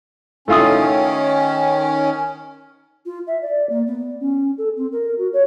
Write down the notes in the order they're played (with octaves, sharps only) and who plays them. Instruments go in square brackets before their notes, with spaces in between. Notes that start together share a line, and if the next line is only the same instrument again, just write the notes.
[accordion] D#3 C#4 [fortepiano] A3 F4 D#6
[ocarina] F4
E5
D5
A#3
B3
C#4
A4
C4
A#4
F#4
C#5